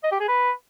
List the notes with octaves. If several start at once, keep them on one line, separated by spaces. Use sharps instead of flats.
D#5
G4
G#4
B4